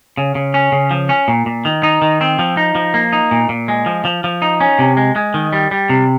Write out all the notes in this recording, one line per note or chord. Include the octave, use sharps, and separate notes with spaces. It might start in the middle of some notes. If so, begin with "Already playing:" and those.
C#3
C#3
C#4
C#3
F3
C#4
A#2
A#2
D#3
D#4
D#3
C4
F3
D#4
F3
A#3
D#4
A#2
A#2
G#3
F3
F3
F3
D#4
C#4
C3
G#3
G#3
D#3
G3
G3
C3